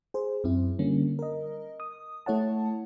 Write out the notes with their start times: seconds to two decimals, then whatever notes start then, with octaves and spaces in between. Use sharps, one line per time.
0.14 G#4 C5
0.44 F#2 C4 E4
0.79 D3 G3 A#3 C#4
1.19 A#4 D#5
1.80 D#6
2.26 A3 E4 C#5 F#5 A5